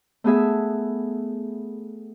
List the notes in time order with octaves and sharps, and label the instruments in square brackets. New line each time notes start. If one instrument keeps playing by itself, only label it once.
[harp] A3 B3 G#4 E5